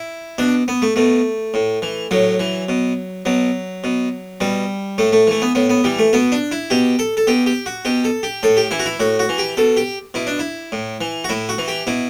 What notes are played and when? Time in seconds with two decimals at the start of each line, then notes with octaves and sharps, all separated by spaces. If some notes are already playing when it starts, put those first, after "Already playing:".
Already playing: E4
0.38 B2 D4
0.68 B3
0.82 A3
0.96 B2 A3
1.54 A2
1.82 E3
2.11 A2 F#3
2.40 E3
2.69 B2
3.25 B2 F#3
3.84 B2
4.41 B2 G3
4.98 A2 A3
5.12 A3
5.27 E3 A3
5.42 B3
5.55 A2 B3
5.70 B3
5.84 E3 G3
5.99 A3
6.13 B2 B3
6.32 D4
6.52 E4
6.70 B2 G4
6.99 A4
7.17 A4
7.27 B2 G4
7.46 G4
7.66 F#4
7.85 B2 G4
8.04 A4
8.23 G4
8.43 A2 A4
8.57 G4
8.71 E3 E4
8.79 F#4
8.86 E4
9.00 A2 F#4
9.19 F#4
9.29 E3
9.38 G4
9.57 B2 A4
9.77 G4
10.14 B2 E4
10.27 D4
10.39 E4
10.72 A2
11.01 E3
11.24 F#4
11.29 A2 E4
11.49 F#4
11.58 E3
11.68 G4
11.87 B2 E4